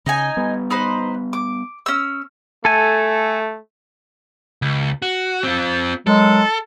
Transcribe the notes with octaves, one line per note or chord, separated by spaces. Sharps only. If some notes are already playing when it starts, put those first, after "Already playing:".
C#3 D#4 D#5 G#5
G3 B3
D#4 B4 C5
D6
C#4 E6
A3 A4 G#5
C#2
F#4
C4 F4
D#3 F#3 G#3 A4